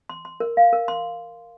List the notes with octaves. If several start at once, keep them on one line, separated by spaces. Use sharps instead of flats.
C6
C6
A#4
F5
A#4
C6